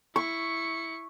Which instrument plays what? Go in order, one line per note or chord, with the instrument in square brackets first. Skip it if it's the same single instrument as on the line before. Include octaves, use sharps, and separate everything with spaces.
[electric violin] E4 C#7 [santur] C#6